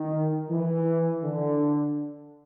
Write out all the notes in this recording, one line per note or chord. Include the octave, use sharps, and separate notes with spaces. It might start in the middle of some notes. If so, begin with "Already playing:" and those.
Already playing: D#3
E3
D3